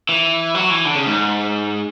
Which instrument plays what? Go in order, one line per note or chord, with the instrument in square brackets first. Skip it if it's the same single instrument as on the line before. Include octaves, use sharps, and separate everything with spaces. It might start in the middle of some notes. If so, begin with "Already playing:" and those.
[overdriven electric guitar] E3
F#3
E3
D3
C#3
G#2